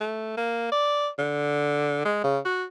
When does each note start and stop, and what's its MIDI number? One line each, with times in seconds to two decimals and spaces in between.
0.01 0.33 57
0.37 0.71 58
0.72 1.09 74
1.18 2.02 50
2.05 2.21 56
2.23 2.39 49
2.45 2.64 66